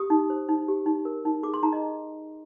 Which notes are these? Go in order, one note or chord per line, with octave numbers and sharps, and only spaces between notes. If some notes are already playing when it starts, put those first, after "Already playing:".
Already playing: G4 D#6
D#4
C5
D#4
G4
D#4
A#4
D#4
G#4 D6
C6
D#4 A#5
D#5